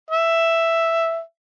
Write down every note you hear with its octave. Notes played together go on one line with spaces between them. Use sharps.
E5